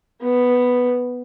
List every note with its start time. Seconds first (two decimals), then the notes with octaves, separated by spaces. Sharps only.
0.22 B3